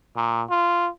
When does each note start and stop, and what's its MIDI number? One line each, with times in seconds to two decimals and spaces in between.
0.16 0.43 46
0.50 0.89 65